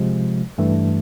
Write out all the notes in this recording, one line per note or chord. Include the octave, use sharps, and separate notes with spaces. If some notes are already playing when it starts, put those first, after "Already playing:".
Already playing: C3 F3 G#3
G2 E3 A3